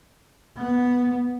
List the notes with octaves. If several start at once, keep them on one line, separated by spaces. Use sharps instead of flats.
B3